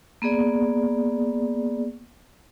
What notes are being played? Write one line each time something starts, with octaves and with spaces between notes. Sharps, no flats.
A#3 B3 G#4 D5